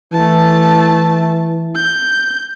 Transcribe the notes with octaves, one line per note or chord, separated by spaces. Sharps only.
E3 A3 A5
G6